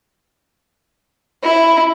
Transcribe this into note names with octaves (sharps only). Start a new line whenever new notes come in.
E4